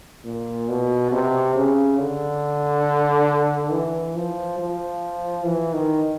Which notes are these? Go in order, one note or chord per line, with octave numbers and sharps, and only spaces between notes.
A#2
B2
C3
C#3
D3
E3
F3
F3
E3
D#3